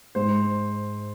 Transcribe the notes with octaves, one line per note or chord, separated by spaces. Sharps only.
G#2 C5